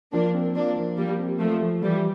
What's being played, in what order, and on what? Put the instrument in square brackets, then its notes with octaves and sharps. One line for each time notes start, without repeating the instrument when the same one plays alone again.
[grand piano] F3 [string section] A#3 D4
[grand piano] C4
[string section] A#3 D4 [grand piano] F4
[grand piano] F3
[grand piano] F3 [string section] G3 A#3
[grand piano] C4
[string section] F3 A3 [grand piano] F4
[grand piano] F3
[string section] E3 G3 [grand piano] F3